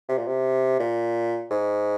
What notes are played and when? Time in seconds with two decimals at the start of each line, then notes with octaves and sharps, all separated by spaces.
0.09 C3
0.18 A#2
0.27 C3
0.79 A#2
1.51 G#2